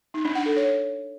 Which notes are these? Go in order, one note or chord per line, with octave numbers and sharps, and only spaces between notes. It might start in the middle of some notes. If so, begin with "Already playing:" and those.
D#4
D4
F#5
A4
C#5